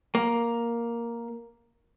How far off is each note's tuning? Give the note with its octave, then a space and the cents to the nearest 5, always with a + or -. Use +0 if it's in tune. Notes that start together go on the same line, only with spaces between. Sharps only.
A#3 +5